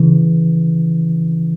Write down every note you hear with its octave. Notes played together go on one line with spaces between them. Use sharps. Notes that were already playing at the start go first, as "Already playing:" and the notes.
Already playing: C#3 E3